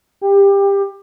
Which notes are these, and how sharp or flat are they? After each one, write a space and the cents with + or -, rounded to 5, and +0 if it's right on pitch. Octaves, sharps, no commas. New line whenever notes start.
G4 +20